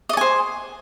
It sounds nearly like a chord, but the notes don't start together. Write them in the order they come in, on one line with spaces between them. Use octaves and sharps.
D#5 D5 G#5 C5